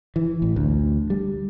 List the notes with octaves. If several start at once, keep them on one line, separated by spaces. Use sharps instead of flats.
E3
A1
D2
G3